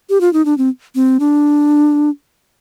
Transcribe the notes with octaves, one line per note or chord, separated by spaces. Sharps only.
G4
F4
D#4
D4
C4
C4
D4